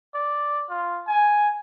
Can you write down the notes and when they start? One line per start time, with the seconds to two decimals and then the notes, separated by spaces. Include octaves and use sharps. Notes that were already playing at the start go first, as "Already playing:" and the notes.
0.14 D5
0.70 F4
1.07 G#5